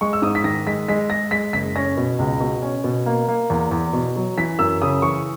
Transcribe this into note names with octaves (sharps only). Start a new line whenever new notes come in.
G#3 C#6
E6
G#2 D#6
B6
D#3 A#6
G#3 B6
G#3 B6
G#3 A#6
G#3 B6
F#1 B6
C#4 A#6
B2
C#2
B2
C#4
B2
A#3
A#3
E2
E2
B2
F#3
E3 B6
F#2 E6
C#3 D#6
E3 C#6